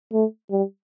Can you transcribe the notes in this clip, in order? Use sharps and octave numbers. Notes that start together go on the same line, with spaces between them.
A3
G3